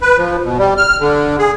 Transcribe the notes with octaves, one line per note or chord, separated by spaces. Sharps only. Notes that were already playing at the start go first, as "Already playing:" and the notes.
B4
F3
B2
G3
F6
D3
G#4